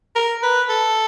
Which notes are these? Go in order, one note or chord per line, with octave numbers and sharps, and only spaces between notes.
A#4
B4
A4